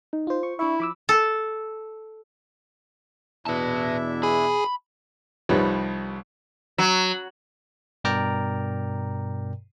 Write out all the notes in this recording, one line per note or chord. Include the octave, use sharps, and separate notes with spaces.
D#4
F4 C5
C#6
D4 E4 E5 C#6
F3 B5 D6 E6
A4
E2 B2 D4 E4 B4 E5 A5
G#4 B5
C2 F3 G3 D#4 B4 C#5
F#3
G2 B2 A#4 D5 G5 A#5